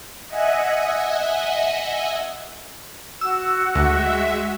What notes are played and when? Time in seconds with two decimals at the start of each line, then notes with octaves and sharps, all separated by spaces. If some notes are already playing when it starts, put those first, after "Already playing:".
0.28 D#5 E5 F#5 G#5
3.21 F#4 E6
3.75 D2 G#3 E5